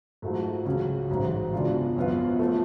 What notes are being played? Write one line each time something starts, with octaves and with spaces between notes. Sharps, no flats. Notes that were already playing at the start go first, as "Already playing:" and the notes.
G#2 F#3 A3 F4
C#2 C#3 F#3 C#4
A1 G#2 F#3
C#2 B2 G#3 D4 F4
F#2 F3 B3 F4
F3 A3